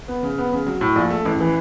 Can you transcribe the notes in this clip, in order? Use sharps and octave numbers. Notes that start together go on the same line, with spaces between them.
B3
C#3
B3
C#3
F#3
A2
A#1
A3
A1
E3